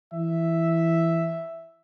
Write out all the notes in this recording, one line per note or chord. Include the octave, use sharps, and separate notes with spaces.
E3 E5